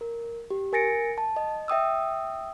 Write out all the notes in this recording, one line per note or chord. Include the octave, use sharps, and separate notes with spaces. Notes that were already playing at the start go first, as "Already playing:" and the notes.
A#4
G4
A#4 G#5 A6 A#6 C#7 D7
A5
D#5
E5 G5 D#6 E6